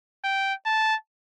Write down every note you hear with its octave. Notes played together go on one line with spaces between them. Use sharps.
G5
A5